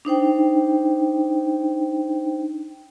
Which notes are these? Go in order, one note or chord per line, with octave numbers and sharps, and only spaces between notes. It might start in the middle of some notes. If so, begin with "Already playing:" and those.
D4 D#4 C5 G5